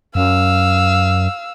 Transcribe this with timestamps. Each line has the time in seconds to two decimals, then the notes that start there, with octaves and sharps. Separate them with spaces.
0.15 F#2 F5 E6